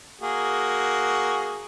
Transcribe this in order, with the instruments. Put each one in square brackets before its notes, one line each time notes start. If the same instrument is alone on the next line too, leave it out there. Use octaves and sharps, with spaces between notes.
[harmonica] A#3 F#4 G#4